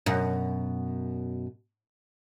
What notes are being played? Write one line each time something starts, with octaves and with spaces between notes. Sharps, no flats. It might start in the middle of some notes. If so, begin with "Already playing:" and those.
F#2 B2